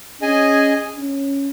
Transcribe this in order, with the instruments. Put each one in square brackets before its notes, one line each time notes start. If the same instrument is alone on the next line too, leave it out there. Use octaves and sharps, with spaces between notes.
[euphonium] C#4 [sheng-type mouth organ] G#4 D#5 G#5
[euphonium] C#4